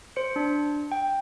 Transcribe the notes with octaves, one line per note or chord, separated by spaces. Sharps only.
C5 C#7
D4
G5